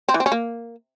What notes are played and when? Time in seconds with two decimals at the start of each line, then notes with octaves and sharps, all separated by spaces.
0.09 C4
0.14 E3
0.20 C4
0.26 C#4
0.32 A#3